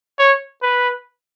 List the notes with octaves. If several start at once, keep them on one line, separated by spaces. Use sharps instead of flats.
C#5
B4